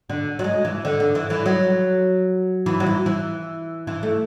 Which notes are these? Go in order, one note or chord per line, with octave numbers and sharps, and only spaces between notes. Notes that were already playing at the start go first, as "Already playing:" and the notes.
D3
F#3
G#3
E3
D3
D3
E3
E3
F#3
E3
F#3
E3
E3
E3
A3